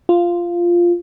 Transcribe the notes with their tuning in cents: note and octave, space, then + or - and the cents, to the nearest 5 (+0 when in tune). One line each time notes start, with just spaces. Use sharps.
F4 -5